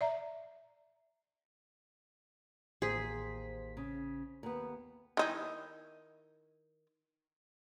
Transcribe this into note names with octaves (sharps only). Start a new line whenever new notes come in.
D5 E5 A#5
A1 D#2 G#4 C5 B6
C#3
D#2 B3
D#3 D#4 E4